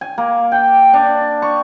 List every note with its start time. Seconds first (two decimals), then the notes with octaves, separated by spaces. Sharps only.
0.01 G#5
0.18 A#3
0.52 G5
0.93 D4
1.42 C#6